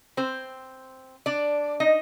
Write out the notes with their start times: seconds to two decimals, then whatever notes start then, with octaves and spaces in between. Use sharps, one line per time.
0.17 C4 C5
1.26 D4 D5
1.80 D#4 D#5